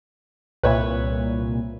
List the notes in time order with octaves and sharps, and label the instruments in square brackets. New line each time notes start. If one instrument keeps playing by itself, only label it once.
[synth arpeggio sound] C2 A#2 [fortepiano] B4 C#5 E5